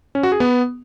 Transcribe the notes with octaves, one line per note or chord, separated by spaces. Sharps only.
C#4
F#4
G#4
B3